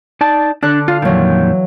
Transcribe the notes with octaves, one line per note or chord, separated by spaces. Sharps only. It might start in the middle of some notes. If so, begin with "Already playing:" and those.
D#4 D5 A5
D3 D4 F#6
F4 F5
F2 A#2 D#3 E3 F#3